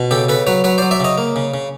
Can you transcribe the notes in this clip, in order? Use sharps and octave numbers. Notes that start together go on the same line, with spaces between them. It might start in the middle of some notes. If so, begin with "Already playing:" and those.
Already playing: B2
C#3 G4 A4
C#3 A4 B4
F#3 B4 C#5
F#3 B4 C#5
C5 D5
F#3
D5 E5
C#3 C#5 D#5
A#3
C#3
C#3